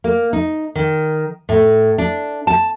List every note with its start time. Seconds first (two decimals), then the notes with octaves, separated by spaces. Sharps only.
0.04 A#3
0.33 D#4
0.75 D#3
1.49 A2
1.98 D4
2.47 A5